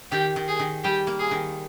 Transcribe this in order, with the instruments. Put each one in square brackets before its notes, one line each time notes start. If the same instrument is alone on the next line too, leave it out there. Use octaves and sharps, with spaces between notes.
[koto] D#3 [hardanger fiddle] G4
[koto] D#3
[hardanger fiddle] G#4
[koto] D#3
[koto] G3 [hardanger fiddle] G4
[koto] A#3
[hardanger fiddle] G#4
[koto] D#3